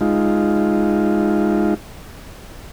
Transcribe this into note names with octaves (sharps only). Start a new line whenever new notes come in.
G#3 D#4 F4